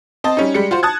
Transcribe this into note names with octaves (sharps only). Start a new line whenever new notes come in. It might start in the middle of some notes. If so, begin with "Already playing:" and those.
C4 D#5 A5
G3 C#4 D#4
G3 G#3 C#7
F4 F#4 C5
A5 D#6 F#6 G#6